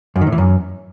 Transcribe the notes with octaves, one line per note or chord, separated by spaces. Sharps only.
F#2
D#3
A2
E3
F#2